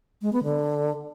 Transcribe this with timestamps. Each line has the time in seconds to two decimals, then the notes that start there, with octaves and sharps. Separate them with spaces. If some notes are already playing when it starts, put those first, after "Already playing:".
0.22 G#3
0.33 B3
0.44 D3